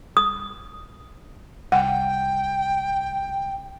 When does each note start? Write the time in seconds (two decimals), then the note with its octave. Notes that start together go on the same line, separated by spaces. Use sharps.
0.17 D#6
1.72 C2 F#5 G5